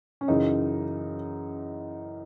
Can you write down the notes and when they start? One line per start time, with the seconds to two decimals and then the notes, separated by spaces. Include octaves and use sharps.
0.21 C#4
0.28 F#2 C#3 E3 D#4